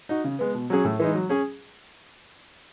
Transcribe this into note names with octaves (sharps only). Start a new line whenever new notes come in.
D#4 F#4
C#3
G#3 B3
B2
F#3 C#4 G#4
A2
E3 G#3 D#4
F#3
C#4 G#4